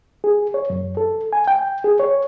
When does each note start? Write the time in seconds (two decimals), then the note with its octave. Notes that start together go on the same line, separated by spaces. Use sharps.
0.24 G#4
0.54 C#5
0.70 F#2
0.97 A4
1.33 G#5
1.48 G5
1.84 G#4
2.00 C#5